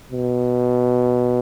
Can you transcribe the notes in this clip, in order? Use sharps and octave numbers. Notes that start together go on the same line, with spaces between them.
B2